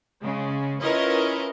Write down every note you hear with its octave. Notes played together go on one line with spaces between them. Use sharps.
C#3 G#3
C#4 E4 F4 A#4 B4 D#5